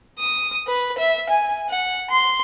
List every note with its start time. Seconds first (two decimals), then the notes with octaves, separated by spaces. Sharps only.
0.18 D#6
0.67 B4
0.98 E5
1.29 G#5
1.70 F#5
2.10 C6